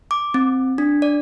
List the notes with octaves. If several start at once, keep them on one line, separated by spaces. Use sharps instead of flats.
D6
C4
D4
D5